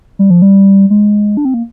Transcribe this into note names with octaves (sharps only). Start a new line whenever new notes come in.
G3
F3
G3
G#3
D4
C4
A#3